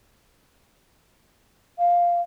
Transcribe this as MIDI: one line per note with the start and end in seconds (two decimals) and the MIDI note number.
1.78 2.20 77